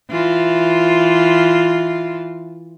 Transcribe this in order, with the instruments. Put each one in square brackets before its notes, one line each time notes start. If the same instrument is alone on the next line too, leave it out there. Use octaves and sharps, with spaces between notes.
[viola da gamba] E3 F4